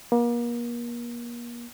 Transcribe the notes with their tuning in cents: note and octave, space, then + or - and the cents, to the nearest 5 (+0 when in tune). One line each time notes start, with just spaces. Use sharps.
A#3 +35